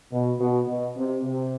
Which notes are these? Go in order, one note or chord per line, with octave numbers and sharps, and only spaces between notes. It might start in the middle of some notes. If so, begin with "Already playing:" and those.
B2
B2
B2
C3
C3